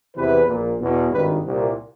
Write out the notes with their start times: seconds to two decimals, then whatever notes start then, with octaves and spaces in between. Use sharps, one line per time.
0.15 E2 C3 E3 B4
0.47 A#1 A#2
0.79 E2 B2
1.11 G#1 G2 D#3 B4
1.44 C2 A#2